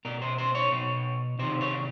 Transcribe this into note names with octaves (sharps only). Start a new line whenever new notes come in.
B2 A#4
C5
C5
C#5
B2
C3 D#3 C5
C#5